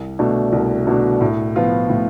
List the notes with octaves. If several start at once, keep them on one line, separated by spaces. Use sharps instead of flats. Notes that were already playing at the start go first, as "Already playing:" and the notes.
Already playing: C2
B2 A3 D4
C2
B2 A3 D4
A2
F3 B3 F4
A2